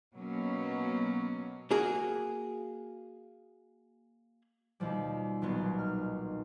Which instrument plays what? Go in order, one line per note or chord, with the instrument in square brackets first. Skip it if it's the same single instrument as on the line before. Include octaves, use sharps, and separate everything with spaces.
[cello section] B2 F#3 A#3 B3 C#4
[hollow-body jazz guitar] A#3 F#4 G#4
[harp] D#2 B2 F3 G3
D#1 B1 B3 C6
F6